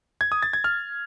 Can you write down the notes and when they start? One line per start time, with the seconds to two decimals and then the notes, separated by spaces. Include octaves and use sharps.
0.21 G#6
0.32 D#6
0.42 A6
0.53 G#6
0.64 F6